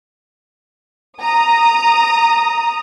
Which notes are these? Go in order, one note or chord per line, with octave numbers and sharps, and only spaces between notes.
A#5 D#6